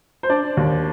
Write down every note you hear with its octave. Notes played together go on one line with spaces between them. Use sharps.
C5
D4 D5
D#2